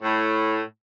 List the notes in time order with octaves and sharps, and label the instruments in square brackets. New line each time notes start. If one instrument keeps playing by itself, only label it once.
[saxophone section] A2